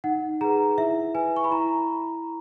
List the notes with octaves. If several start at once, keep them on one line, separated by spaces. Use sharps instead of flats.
D#4 F#5
G#4 B4 A#5
E4 E5
B4 G#5
C#6
B5
E4 A#5